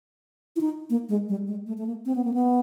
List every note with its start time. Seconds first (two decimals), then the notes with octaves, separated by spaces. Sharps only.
0.56 E4
0.61 D#4
0.90 A#3
1.09 G#3
1.29 G3
1.47 G#3
1.67 A3
1.77 A3
1.86 A#3
2.06 C4
2.15 B3
2.24 A#3
2.34 B3